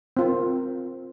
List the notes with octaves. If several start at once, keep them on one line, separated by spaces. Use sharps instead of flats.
C4 F4 A#4